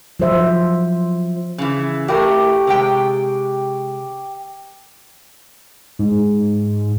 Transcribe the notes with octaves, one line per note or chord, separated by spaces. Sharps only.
F3 F#3 C5 E5
C#3 E3
A2 A3 G4 A#4 C#6
C3 G#3 G5
G#2